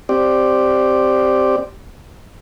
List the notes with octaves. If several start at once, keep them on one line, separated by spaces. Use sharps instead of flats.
C4 G4 D5